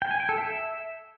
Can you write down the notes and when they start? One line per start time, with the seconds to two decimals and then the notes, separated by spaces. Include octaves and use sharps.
0.02 G5
0.11 G#5
0.20 G5
0.29 A4
0.38 E5